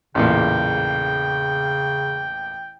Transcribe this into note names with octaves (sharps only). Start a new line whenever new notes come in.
A1 E2 A#2 C#3 G5